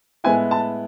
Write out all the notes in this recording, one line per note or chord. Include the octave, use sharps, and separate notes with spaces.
A2 G#3 B3 E4 G#5
A5